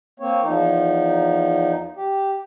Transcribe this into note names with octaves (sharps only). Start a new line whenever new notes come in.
A#3 C4 C#5
E2 F3 D#4
G4